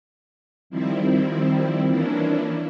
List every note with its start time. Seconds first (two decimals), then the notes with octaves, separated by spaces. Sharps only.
0.70 D#3 F3 G3 C4 E4
1.87 E3 F3 A#3 C#4 D4 E4